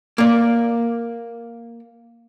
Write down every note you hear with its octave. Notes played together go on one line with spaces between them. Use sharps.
A#3 D5